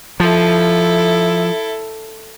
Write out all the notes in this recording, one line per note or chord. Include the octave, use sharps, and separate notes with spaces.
F3 E4 A4